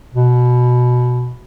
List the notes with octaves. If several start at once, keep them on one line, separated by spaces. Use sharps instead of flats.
B2